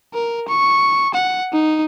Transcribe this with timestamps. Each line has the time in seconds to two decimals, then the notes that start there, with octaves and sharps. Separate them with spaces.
0.14 A#4
0.48 C#6
1.14 F#5
1.53 D#4